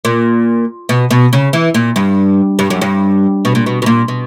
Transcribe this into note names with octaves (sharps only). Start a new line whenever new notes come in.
A#2
B2
B2
C#3
E3
A#2
G2
G2
F#2
G2
B2
A#2
B2
B2
A#2
B2